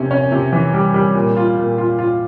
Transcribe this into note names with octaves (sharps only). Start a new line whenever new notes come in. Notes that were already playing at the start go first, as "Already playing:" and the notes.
Already playing: C3 C#4
C#4
C3
E3
G3
G3
A#2
F4
A#2
F4
F4